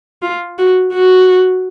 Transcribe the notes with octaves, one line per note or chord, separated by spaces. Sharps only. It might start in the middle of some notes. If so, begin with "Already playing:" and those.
F4
F#4
F#4